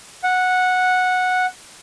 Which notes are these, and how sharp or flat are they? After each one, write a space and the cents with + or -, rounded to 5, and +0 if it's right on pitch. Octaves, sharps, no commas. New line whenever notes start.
F#5 -10